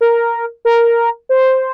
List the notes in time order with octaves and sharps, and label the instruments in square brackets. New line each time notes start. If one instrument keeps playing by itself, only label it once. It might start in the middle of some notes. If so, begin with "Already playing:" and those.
[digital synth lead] A#4
A#4
C5